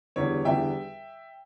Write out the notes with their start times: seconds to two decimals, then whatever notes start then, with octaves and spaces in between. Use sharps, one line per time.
0.16 E2 D3 G3 C#5
0.45 E2 D3 G3 E5 G5